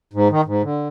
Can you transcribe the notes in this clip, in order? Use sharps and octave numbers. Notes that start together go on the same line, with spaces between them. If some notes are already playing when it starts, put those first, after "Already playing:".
G#2
D#3
G#2
D3